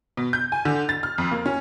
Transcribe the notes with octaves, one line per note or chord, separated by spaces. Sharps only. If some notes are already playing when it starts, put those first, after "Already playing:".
B2
G6
G#5
D3
A6
F6
F2
A#3
C#4